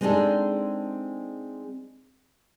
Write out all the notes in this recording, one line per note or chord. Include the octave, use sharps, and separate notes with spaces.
G#3 C4 D4 D#4 G#4 A4